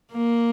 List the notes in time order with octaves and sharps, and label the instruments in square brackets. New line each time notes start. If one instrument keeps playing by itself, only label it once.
[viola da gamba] A#3